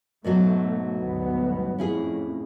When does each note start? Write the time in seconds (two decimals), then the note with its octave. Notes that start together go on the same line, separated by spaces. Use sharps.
0.24 G#2 B2 F#3 A3
0.97 G1 D2 B3
1.79 F2 A2 C#4 E4 G#4